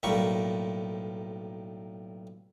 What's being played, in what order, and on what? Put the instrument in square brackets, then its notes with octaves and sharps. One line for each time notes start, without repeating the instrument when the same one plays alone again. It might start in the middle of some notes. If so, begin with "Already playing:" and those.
[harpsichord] B1 A2 G3 A#3 C#6